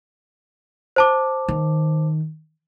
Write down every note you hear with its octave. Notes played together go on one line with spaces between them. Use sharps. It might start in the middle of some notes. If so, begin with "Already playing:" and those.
C5 A5 D6
D#3